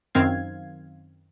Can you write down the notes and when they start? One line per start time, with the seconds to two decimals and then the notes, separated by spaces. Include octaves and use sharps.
0.15 F#2 D#3 C4 F5 G#6